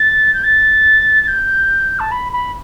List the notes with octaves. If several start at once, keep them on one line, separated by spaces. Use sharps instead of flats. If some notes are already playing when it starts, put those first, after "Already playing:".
Already playing: A6
G6
A6
A6
G6
A5
B5
B5